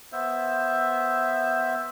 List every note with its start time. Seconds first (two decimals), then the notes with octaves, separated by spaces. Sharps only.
0.12 B3 C5 E5